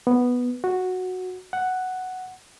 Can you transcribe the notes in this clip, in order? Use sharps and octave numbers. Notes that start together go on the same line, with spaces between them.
B3
F#4
F#5